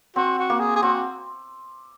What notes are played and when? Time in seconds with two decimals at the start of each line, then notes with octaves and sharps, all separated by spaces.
0.16 C4 F#4
0.39 F#4
0.50 A#3
0.60 G#4
0.76 G#4
0.83 C4 F#4